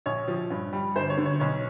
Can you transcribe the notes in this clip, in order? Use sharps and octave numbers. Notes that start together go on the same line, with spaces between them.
A#1 C#5
F3
G2
G3
G1 C5
C#5
D3
C#5
B1 C#5